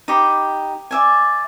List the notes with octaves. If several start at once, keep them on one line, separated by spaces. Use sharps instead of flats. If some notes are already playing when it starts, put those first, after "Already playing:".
D#4 G4 B5
D5 E5 G#5